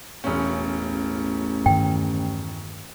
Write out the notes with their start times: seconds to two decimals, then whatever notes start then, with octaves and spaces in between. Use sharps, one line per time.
0.24 E1 A1 C#4
1.66 G2 D#3 G5